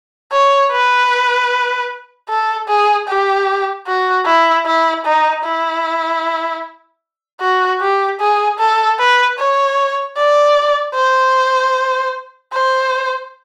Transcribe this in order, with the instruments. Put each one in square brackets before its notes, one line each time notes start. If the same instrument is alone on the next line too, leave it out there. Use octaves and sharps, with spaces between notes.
[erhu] C#5
B4
A4
G#4
G4
F#4
E4
E4
D#4
E4
F#4
G4
G#4
A4
B4
C#5
D5
C5
C5